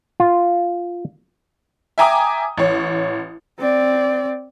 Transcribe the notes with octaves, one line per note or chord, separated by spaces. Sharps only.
F4
E5 G5 G#5 A#5 D6 D#6
A1 C#5
C4 D5